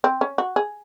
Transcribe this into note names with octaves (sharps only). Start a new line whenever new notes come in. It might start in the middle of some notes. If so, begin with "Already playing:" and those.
C4
C#4
F#4
G#4